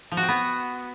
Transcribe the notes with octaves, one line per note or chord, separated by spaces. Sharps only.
F3
F#4
C4
B3